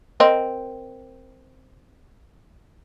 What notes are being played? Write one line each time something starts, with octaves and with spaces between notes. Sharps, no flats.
C4 A#4 D#5